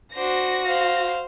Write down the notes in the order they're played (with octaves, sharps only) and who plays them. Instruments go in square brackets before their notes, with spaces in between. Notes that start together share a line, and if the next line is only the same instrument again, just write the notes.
[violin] D4 C5 [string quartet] F#4 A#6
[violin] C5 [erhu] F5